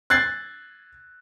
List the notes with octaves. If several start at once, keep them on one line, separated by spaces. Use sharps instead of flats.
F#6 G#6 A6 C7